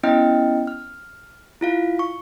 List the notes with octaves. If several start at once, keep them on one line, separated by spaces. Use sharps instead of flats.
B3 C#4 E4 D#5 G5 F6
F6
E4 F4 F5
C#6